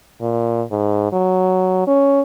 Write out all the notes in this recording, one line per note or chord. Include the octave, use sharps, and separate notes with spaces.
A#2
G#2
F#3
C#4